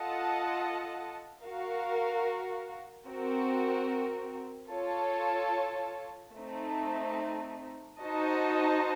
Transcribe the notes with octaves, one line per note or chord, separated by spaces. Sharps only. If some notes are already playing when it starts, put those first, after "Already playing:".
Already playing: F4 A4 D#5 F#5 A5
F#4 A#4 F5
C4 F#4 A#4
F4 A4 C#5 A5
A3 C4 D#4
D#4 F#4 C5 D#5 A5